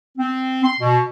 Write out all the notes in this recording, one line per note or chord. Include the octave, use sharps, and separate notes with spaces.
C4
C6
B2